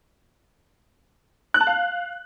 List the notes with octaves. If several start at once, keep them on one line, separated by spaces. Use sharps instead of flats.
F#6
A5
F5